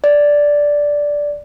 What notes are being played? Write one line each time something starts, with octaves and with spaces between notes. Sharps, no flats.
D5